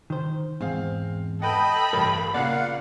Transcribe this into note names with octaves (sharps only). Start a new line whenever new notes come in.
D#3 C5
E2 G#2 C4 F5
A4 B4 D#5 F#5 G5 B5
A1 G2 A#4 B4
A#2 C#3 A#3 D5 F5 F#5